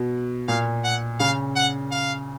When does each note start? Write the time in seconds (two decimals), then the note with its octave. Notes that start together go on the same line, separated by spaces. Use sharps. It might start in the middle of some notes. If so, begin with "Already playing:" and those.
Already playing: B2
0.48 A#2 F5
0.84 F#5
1.20 C#3 F5
1.56 F#5
1.91 F5